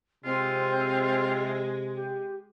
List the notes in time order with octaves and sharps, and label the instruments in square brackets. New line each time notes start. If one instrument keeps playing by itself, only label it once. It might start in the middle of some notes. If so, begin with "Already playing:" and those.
[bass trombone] C3 [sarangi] G#3 [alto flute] C4 [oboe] F4
[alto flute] G4